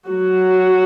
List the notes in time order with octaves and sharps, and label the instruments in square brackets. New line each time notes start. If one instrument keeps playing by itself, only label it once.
[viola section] F#3 F#4